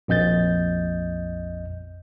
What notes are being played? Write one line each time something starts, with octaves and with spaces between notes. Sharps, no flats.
A#1 F2 D#5 G6 A6